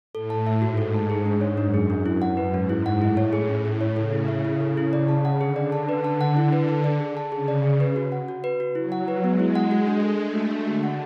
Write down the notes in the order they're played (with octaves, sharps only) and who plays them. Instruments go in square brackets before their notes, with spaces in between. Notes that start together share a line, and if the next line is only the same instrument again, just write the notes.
[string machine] A2 [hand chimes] A4
[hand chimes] A5
E5
[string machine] G#2 [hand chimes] F#4
[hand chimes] A4
A5
G#4
D4
C#5
[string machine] F#2 [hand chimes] D4
[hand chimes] G#4
D4
E4
F#5
B4
[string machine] G#2 [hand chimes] C#4
[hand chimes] E4
F#5
[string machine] A2 [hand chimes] E4
[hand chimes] C#5
G#4
C#4
E4
C#5
[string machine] C#3 [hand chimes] A4
[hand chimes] E4
E5
E4
A4
E4
[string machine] C#3 [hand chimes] D5
[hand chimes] A5
F#5
[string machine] D3 [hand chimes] G#4
[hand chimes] D5
A5
B4
A5
F#5
E4
B4
A5
D5
G#4
A5
[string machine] C#3 [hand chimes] G#4
[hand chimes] D5
G#4
B4
F#4
F#5
F#4
B4
F#4
[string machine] F#3 [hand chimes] E4
[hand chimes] F#5
B4
[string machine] G#3 [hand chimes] B3
[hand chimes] E4
F#5
F#4
D4
A4
[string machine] A3 [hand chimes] D4
[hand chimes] F#4
D4
[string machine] D3 [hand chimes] F#4
[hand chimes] F#5